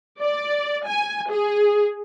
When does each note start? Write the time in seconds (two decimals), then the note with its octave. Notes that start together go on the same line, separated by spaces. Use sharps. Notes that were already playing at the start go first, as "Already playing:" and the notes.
0.21 D5
0.86 G#5
1.31 G#4